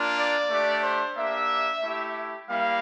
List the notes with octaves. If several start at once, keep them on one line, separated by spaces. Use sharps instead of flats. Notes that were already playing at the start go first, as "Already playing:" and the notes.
Already playing: A#3 D4 F4
D5
A3 D4 G4
C5
A#3 D4 G4 E5
A3 E4 G4
G3 A#3 E4 F5